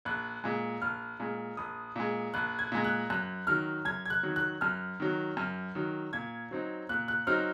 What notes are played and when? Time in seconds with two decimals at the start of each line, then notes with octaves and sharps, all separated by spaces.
0.05 A#1 F#6
0.44 A#2 G#3
0.82 A#1 F6
1.20 A#2 G#3
1.57 A#1 D#6
1.96 A#2 G#3
2.34 A#1 F#6
2.59 G#6
2.72 A#2 G#3
2.84 F#6
3.10 F#2 F#6
3.47 D#3 F#3 F6
3.85 F#2 G#6
4.06 G#6
4.10 F#6
4.23 D#3 F#3
4.36 F#6
4.61 F#2 F6
5.00 D#3 F#3
5.37 F#2 F6
5.75 D#3 F#3
6.13 A#2 G#6
6.51 F#3 C4 D#4
6.89 A#2 F#6
7.08 F#6
7.27 F#3 C4 D#4 F6